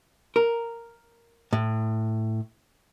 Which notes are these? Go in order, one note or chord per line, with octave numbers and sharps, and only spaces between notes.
A#4
A2